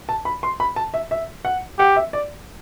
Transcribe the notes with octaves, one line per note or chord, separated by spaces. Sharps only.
A5
B5
C6
B5
A5
E5
E5
F#5
G4 F#5
E5
D5